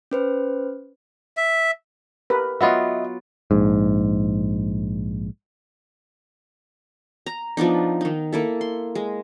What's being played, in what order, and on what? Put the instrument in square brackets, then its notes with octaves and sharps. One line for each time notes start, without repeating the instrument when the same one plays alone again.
[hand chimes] C#4 B4 C5
[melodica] E5
[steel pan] G4 A#4 B4
[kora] F#3 B3 F4 [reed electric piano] D#5 E5
[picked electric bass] A#1 G#2
[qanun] A#5
F3 B3 D4 D#4
D#3 D#4
A#3 E4 A4
C6
G#3